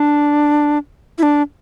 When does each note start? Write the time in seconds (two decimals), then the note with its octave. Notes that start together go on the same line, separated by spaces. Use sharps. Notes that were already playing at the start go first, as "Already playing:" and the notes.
Already playing: D4
1.18 E4
1.23 D4